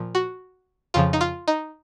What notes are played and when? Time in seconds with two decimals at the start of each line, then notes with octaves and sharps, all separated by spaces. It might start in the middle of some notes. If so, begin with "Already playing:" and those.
Already playing: A#2 F3
0.15 F#4
0.94 F2 C#3 F3 F4
1.13 D#4
1.21 F4
1.48 D#4